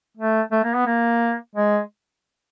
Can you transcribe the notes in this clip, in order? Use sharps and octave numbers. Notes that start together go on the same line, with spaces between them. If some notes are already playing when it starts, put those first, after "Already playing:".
A3
A3
A#3
B3
A#3
G#3